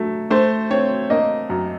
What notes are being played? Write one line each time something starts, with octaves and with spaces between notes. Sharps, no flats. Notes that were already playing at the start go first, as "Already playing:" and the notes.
Already playing: F#3 A3
A3 C5
C4 C#5
A#3 D#5
F#2